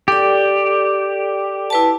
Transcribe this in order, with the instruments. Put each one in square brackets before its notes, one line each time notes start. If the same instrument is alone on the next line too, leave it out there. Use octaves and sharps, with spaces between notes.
[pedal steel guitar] G4 [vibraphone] A4 D5
[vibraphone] E4 B4 A5